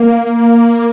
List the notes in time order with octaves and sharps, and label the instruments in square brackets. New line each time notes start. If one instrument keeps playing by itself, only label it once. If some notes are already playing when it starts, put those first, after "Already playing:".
Already playing: [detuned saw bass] A#3